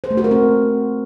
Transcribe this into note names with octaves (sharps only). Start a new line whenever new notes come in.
C5
A3
F#4
A#4
C4